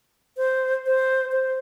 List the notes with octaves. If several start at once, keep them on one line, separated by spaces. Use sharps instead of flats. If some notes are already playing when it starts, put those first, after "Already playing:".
C5
C5
C5